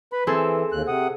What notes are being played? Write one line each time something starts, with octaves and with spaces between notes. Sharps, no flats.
B4 B5
E3 C4 G#4 A4
D#2 F#6
C3 F#5 D#6